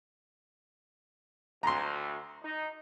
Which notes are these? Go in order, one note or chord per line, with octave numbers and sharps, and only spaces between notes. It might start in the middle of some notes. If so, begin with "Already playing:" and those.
D2 A#5 C6
D#4